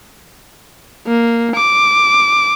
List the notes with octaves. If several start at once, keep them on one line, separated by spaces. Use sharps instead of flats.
A#3
D6